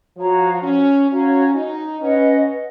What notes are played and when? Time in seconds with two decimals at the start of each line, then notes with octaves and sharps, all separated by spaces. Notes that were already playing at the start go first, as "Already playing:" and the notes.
0.16 F3 F#4 C#5 F5 A#5
0.62 C#4
1.08 C#4 F#4 C#5 F5 A#5
1.55 D#4
2.01 C#4 B4 D#5 F#5